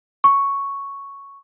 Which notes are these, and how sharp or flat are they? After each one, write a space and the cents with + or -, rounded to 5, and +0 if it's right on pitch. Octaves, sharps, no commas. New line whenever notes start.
C#6 +0